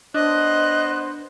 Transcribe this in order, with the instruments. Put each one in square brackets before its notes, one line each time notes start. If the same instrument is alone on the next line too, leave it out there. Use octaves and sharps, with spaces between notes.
[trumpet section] B3 C5 [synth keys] D4 [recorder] D#5 [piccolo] F#6